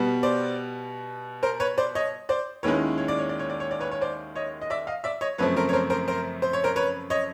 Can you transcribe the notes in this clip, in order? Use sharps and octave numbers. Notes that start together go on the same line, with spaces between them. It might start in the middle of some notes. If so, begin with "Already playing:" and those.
Already playing: B2 G3 B3
C5 D5
A#4 C5
B4 C#5
C5 D5
C#5 D#5
C5 D5
D#2 D#3 G#3 C#4 E4 B4 C#5
C#5
D5
C#5
D5
C#5
D5
C#5
D5
B4 C#5
C#5
C5 D5
C#5 D#5
D#5
D5 E5
D#5 F5
D5 E5
C#5 D#5
F#2 C#3 F3 A3 C4 B4 C#5
A#4 C5
C#5
A#4 C5
A#4 C5
A#4 C5
C5
C#5
A#4 C5
B4 C#5
C#5 D#5